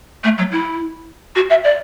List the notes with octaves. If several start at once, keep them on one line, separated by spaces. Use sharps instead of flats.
A3
F#3
E4
F#4
E5
D5